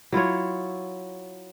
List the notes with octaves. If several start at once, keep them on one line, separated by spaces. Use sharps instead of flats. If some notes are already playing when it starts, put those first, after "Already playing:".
F#3 E4 F4 C#5